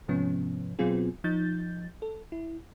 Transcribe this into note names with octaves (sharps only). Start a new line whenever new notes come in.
G#2 C3 F3 B3 C#4
B2 F#3 B3 C4 F4 G#4
F3 D#4 G6 A6
A4
E4